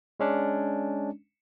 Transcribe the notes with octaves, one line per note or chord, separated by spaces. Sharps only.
G#3 C#4 D4